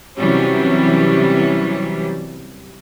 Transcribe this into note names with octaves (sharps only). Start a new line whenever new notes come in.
C3 E3 F#3 G3 C#4